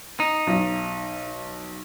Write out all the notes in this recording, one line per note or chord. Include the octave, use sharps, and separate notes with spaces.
D#4
B1